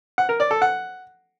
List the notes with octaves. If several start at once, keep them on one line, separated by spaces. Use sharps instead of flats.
F#5
A#4
D5
A4
F#5